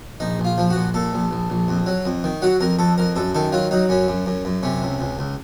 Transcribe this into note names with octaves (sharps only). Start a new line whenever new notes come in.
A#1 D#4
A#1
F4
F3
F#4
A#1
A#2 A4
A#1
A#1
A#1
F2
F#3
F2
D#3
F#3 F#4
F2 A#4
F2 A4
F2 A#4
F#2 A4
D#3 A4
F#3 F4
F#3 D#4
F#2 C#4
F#2
F#2
F#2
C3 C#4
C#2
C#2
C#2